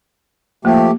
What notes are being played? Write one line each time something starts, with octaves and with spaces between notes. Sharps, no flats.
F3 A3 A#3 G4